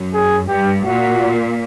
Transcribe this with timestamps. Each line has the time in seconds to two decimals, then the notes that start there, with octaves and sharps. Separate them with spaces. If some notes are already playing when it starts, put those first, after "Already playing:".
Already playing: F#2
0.13 G#4
0.48 G2 G4
0.84 A#2 F#4